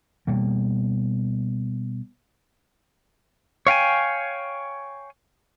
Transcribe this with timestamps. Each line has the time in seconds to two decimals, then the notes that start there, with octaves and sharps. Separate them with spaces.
0.27 B2 G3 A#3
3.67 C#5 F5 G5 G#5